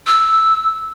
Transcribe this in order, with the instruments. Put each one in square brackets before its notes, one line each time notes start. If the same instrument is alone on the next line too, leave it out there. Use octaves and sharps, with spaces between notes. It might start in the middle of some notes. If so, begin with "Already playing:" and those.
[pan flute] E6